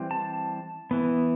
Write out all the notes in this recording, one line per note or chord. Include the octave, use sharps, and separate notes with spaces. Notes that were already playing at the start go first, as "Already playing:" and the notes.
Already playing: E3 G3 C4
A5
E3 B3